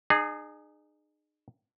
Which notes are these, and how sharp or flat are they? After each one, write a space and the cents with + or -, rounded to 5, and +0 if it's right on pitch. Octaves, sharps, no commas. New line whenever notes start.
D#4 -40 G#4 +0